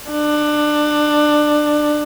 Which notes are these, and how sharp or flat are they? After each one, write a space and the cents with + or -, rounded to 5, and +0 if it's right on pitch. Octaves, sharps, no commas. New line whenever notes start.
D4 +20